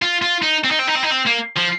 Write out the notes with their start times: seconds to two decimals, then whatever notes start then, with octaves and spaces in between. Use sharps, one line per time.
0.02 F4
0.22 F4
0.42 D#4
0.64 C4
0.71 D#4
0.79 C4
0.87 D#4
0.95 C4
1.03 D#4
1.10 C4
1.26 A#3
1.56 F3